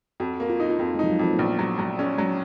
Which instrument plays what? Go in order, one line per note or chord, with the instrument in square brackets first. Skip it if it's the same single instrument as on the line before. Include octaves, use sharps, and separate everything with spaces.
[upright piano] F2 [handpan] F#4
[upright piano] A#3
[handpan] F4
[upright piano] D#4
[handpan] F4
[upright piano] F2 [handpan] D#4
[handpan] G#3
[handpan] F3 [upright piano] D#4
[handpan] F#3
[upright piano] F2 [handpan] F3
[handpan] A#3
[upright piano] A#1 [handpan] B3
[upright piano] F#3
F#3
C#4
F#3